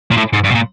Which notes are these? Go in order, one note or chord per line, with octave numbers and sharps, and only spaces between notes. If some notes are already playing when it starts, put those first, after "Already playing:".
A#2
A2
G#2
G2
B2
A#2